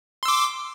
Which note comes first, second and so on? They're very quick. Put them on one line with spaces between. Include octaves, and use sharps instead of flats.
C6 E6 D6